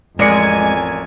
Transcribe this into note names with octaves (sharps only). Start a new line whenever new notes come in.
A1 F2 G#3 A#4 D5 G#5 C#7